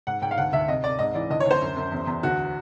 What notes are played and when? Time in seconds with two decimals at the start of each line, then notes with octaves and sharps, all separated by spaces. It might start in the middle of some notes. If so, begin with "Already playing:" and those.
0.07 G#2 F#5
0.22 G#2 G5
0.31 F5
0.38 D2 F#5
0.53 D2 E5
0.68 C2 D#5
0.84 C2 D5
0.99 G#2 D#5
1.14 E3 D5
1.30 D2 D#5
1.40 C#5
1.45 D2
1.51 C5
1.61 F#2
1.77 F#2
1.92 E2
2.07 E2
2.23 D2 F#4